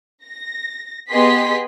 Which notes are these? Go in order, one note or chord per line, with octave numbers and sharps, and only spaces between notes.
A#6
B3 G4 G#4 D#5 C6 B6